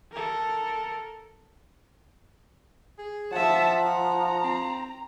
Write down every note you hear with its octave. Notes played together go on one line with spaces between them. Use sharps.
A4 A#4
G#4
F3 E5 F#5 A5
A#5
C4